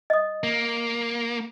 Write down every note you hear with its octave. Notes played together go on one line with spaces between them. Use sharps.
D#5 D#6
A#3